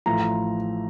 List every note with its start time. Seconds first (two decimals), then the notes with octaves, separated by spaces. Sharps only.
0.06 A1 A2 F3 A#5